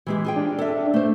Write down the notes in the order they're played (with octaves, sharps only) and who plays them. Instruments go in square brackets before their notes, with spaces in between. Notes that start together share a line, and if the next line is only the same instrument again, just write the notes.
[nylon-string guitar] E3 G#3 G4
F4 G#4 G5
[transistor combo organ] D4
[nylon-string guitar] A4 E5
A3 C5